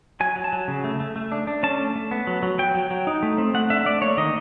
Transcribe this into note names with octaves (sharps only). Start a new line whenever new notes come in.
F#3 G#5
F#3
A5
F#3
C#3
A3
A3
A3
D4
D4
C#4 A5
A3
A3
B3
F#3
F#3
F#3 G5
F#3
F#3
D#4
A3
C4
A3 F#5
D4 E5
A3 D5
A#3 C#5
D#3 D#5